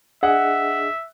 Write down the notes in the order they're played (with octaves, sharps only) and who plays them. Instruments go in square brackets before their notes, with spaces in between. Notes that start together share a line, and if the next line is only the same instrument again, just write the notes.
[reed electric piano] D4 G#4 D#5 [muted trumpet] E5 [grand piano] F#5